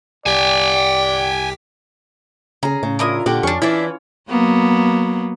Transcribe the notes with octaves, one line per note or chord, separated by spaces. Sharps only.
C2 G4 D5 G5 G#5 B6
C#3 C#4 G#4 A#5
A2 C#3
D4 E4 F4 A#4 D#6
A#2 D3 F#4 G4 F#5 D6
F2 C#4 D4 C#6
E3 D4 E4 C#5 D5 E5
F#3 A#3 B3